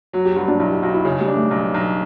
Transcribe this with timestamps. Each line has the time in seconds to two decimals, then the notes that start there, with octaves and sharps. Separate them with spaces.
0.13 F#3 F#4
0.25 G4
0.36 G2 F#4
0.48 D4
0.60 B1 E4
0.72 G4
0.82 B1 F#4
0.94 E4
1.05 C#3 C#4
1.21 G3
1.28 D4
1.36 A3
1.51 B1
1.74 B1